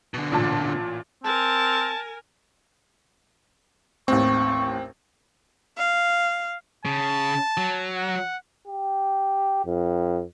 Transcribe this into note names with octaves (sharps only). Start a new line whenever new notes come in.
B2 D3
A1 A#2 A5
C4 A#4 G#5 A5
A1 D#2 A2 C4 C#6
F5
C#3 A5
F#3
F#5
G4
F2